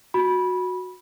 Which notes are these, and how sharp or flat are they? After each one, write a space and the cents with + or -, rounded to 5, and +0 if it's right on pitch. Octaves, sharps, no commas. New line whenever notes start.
F#4 -15 B5 -15